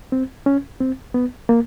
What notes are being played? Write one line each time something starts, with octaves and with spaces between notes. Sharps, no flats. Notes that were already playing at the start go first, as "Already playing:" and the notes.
C4
C#4
C4
B3
A#3